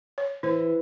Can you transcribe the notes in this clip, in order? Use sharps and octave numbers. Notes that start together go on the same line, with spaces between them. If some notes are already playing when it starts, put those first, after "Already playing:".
C#5
E3 E4 C5